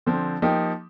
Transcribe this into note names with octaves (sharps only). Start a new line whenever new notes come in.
D3 F3 C4
F3 A#3 D#4 G4